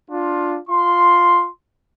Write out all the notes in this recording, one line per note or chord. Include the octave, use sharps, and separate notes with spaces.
D4 F4
F4 C6